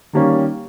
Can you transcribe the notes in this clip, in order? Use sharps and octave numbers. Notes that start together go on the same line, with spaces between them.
D#3 G3 A#3 C#4